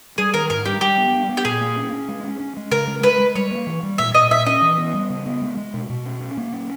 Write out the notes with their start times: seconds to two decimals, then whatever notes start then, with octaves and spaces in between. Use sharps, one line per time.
0.18 G3 G#4
0.34 D#3 A#4
0.50 G#2 A#4
0.65 G3 G4
0.81 G3 G4
0.98 B3
1.13 G3
1.29 B3
1.37 G4
1.45 A#2 G#4
1.61 A#3
1.76 C#4
1.92 C#4
2.08 G#3
2.24 C#4
2.40 C#4
2.57 G#3
2.71 C#3 A#4
2.87 G#3
3.03 G#3 B4
3.20 G#3
3.35 G3 C#5
3.51 A#3
3.67 E3
3.83 G3
3.98 A#2 E5
4.14 A#2 D#5
4.31 A#2 E5
4.46 C#4 D#5
4.62 E3
4.78 B3
4.94 G3
5.10 C#3
5.26 B3
5.42 G#3
5.57 G#3
5.74 B2
5.90 B2
6.06 C#4
6.20 C#4
6.37 A#3
6.52 C#4